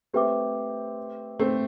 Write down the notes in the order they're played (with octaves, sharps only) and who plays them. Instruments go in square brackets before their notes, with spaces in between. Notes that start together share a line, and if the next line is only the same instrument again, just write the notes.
[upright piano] A3 C4 [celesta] G4 B4 E5 G5 D6
[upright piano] A3 C4